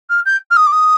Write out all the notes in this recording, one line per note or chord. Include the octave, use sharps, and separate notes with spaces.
F6
G6
F6
D#6
D6
D#6